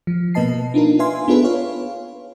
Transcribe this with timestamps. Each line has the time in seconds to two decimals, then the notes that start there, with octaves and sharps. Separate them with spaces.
0.07 F3
0.34 B2 A#3 B4 D#5 A5 C7
0.74 D4 D#4 F4 A#4
0.99 B4 E5 F5 G#5 C6
1.28 B3 D4 F4 G#4 A4 B4
1.44 C#5 F5